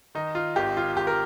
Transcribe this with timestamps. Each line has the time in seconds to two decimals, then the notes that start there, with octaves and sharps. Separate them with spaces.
0.15 D#3 D#4
0.35 F4
0.56 G#1 G4
0.77 F4
0.96 G#1 G4
1.07 A#4